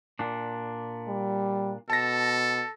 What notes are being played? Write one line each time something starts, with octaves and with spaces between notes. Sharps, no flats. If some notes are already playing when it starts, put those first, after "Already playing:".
A#2 D4
G3
B2 A4 A5 A#6